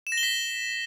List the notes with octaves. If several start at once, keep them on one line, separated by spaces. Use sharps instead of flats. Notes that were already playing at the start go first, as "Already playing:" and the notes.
E7
A#6
G7
B6